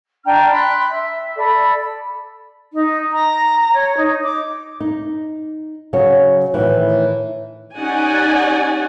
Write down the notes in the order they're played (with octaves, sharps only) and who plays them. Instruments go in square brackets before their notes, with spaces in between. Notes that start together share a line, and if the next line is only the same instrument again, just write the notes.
[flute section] D4 G5 A#5 F6
B5 C6 F#6
E5
A4 D5 B5
[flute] D#4
A#5
A#5
C#5
D#4
D6
[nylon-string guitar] D#4
C#3 F#3 C#5
A2 D#3 E3
[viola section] C#4 D#4 G4 D5 F#5 G#5